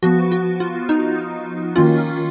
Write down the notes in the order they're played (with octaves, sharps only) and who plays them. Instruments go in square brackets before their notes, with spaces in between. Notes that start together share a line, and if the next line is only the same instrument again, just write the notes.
[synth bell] F3 B3 F#4
F#4
F4
D#4
D#3 A#3 C#4 F4